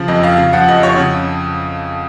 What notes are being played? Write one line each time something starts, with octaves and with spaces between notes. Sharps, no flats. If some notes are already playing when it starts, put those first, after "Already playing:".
Already playing: C#3 F3
F2 D#5
F2 F5
C#3 F5
F3 F#5
F2 D#5
F2 C#5
C#3